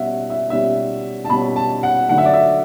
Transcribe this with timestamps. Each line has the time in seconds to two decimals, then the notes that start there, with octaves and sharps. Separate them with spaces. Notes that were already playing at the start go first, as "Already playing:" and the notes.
Already playing: B2 G3 C#4 E5 F#5
0.30 E5
0.50 B2 G3 C#4 E5
1.25 A5
1.30 B2 G3 C#4 B5
1.56 A5
1.83 F#5
2.09 D3 F#3 A3 F#5
2.18 E5
2.26 D5
2.33 E5